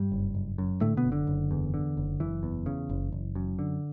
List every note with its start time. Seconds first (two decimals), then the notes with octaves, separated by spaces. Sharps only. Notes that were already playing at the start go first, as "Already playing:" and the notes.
Already playing: G2 G3
0.12 F#1
0.35 F#1
0.58 F#2
0.81 A2 D3 A3
0.97 B2 B3
1.04 F#1
1.12 D3
1.27 F#1
1.51 E2
1.74 D3
1.97 F#1
2.20 F#1 E3
2.43 E2
2.66 C#3
2.89 F#1
3.12 F#1
3.35 F#2
3.59 D3